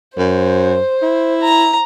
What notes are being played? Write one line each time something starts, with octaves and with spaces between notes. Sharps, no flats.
F#2 C5
E4
A#5